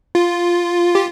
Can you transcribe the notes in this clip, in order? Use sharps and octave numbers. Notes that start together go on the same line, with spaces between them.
F4
G4